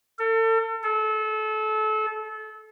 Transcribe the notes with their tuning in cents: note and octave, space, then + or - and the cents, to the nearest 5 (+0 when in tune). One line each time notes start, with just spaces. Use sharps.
A4 +35
A4 -30